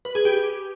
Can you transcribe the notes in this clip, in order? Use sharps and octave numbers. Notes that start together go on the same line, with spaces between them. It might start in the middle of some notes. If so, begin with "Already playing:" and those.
B4
G#4
G4